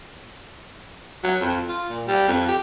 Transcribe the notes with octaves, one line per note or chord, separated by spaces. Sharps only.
F#3
F2
F4
A#2
G3
F2
G4